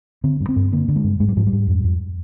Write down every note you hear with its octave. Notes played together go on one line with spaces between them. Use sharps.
D3 C4
G2
C4
G2
D3 A#3
D3
G#3
G2
G#2 G#3
G3
G#2 F3
G3
G#2
F2
F2